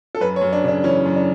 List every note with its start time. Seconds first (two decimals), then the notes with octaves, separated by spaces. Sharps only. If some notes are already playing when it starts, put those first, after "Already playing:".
0.15 A4
0.21 F#2 B4
0.36 C#5
0.41 F#2
0.53 D4
0.64 C#3 D4
0.84 E3 C#4
1.05 F#2
1.16 D4